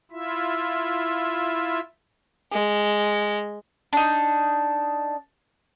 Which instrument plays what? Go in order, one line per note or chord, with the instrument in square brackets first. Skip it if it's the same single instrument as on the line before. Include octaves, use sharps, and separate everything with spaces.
[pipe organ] E4 F4 E5
[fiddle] G#3
[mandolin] D4 D#4